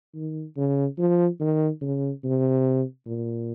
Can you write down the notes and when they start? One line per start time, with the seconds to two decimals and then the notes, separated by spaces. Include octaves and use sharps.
0.15 D#3
0.57 C#3
0.98 F3
1.40 D#3
1.81 C#3
2.24 C3
3.06 A#2